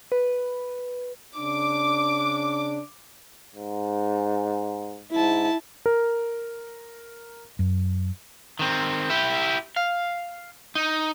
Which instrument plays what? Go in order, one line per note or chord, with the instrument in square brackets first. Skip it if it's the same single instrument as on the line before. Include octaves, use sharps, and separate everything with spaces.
[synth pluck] B4
[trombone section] C#3 D4 [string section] D6
[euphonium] G#2
[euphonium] G#2 [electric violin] E4 A5
[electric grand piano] A#4
[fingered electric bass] F#2
[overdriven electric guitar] D#3 C4
E4 G4
F5
D#4